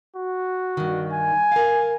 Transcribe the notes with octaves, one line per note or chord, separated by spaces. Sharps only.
F#4
G2 D#3
G#5
A#4 F5